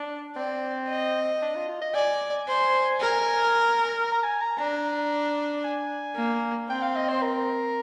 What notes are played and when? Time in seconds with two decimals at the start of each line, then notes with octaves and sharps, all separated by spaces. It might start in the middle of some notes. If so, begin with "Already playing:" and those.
Already playing: D4
0.36 C4 D5
0.89 D#5
1.42 D4
1.55 F4
1.68 F4
1.81 D#5
1.95 D5 G#5
2.48 C5
3.01 A#4
4.12 A#5
4.23 G#5
4.41 A#5
4.58 D4 A#5
5.64 G#5
6.16 A#3
6.69 C4 G5
6.82 F5
6.96 D#5
7.09 C5
7.22 A#4